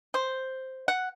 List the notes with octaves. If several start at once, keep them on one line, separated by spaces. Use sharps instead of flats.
C5
F#5